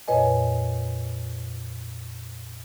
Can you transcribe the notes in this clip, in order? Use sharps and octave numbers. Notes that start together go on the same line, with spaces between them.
F2 A#2 B4 C#5 D#5 G#5